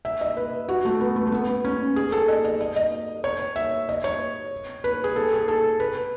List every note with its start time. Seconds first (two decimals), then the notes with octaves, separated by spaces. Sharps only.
0.05 E5
0.21 D#5
0.37 B4
0.68 F#4
0.85 A3
1.01 B3
1.16 A3
1.27 A3
1.32 B3
1.65 C#4
1.96 G#4
2.12 A4
2.28 D#5
2.45 D#5
2.61 D#5
2.76 D#5
3.24 C#5
3.56 E5
3.89 D#5
4.04 C#5
4.84 B4
5.04 G#4
5.16 A4
5.33 G#4
5.48 A4
5.80 B4